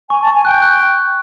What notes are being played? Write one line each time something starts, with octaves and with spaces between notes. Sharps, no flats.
G#5 C#6
A5
C#6
G#5
G5 F#6
F#6